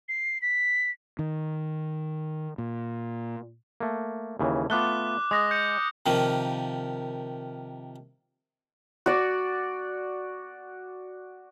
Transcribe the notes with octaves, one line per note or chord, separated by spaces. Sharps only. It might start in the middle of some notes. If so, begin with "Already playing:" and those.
C7
B6
D#3
A#2
A3 A#3
D#2 C#3 E3
A3 B3 F4 D6 F#6 G7
G#3 D#6 A#6
G6 C#7
C3 D#3 F3 A#3
F#4 D5